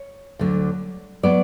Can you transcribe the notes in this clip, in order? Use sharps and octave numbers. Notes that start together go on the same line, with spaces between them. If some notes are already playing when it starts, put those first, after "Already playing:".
Already playing: C#5
D2 D3 F#3
F#3 B3 D5